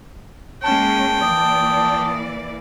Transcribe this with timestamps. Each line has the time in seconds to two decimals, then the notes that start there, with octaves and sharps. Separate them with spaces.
0.64 G#3 A#3 C#4 G5 A5
1.21 E3 A#3 D5 D#6